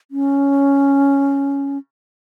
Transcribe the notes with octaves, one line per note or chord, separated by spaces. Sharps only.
C#4